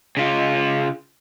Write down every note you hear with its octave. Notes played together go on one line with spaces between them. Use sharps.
C#3 F4